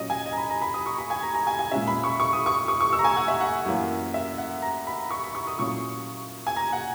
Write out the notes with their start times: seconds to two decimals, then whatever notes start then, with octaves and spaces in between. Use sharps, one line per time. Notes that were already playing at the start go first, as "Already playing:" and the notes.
Already playing: A#2 F#3 C#4 D#5
0.10 G#5
0.26 D#5
0.33 A#5
0.37 B5
0.50 A#5
0.62 B5
0.74 D#6
0.86 C#6
0.99 B5
1.10 G#5
1.23 A#5
1.35 A#5
1.47 G#5
1.59 G#5
1.71 A#2 G#3 C#4 E5
1.87 B5
2.04 C#6
2.20 C#6
2.33 D#6
2.46 C#6
2.68 C#6
2.81 C#6
2.93 E6
2.99 A#5
3.04 G#5
3.17 F#5
3.28 E5
3.41 F#5
3.65 F#2 E3 A#3 C#4
4.14 E5
4.38 F#5
4.62 A#5
4.87 B5
5.11 C#6
5.23 B5
5.35 C#6
5.47 D#6
5.59 A#2 F#3 C#4 E4 C#6
6.47 G#5
6.56 A#5
6.73 F#5